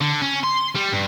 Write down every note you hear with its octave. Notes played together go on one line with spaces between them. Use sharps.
D3
C#4
C6
G3
G2